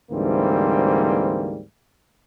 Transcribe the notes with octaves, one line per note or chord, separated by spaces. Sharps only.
D2 G#2 E3 G3 A#3 C4